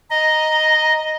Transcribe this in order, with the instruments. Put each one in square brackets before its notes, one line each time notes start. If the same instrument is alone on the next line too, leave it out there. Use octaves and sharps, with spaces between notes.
[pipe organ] D#5 [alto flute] A#5